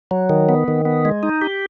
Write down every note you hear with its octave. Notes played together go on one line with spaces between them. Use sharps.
F#3
D#3
B3
D#3
B3
G#3
D#4
G4